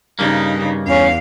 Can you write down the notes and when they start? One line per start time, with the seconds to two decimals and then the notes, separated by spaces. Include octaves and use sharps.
0.19 G2 C#3 A#3 D#4
0.86 E2 C#4 F5